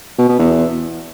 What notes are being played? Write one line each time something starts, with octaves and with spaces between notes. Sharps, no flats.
B2
B2
E2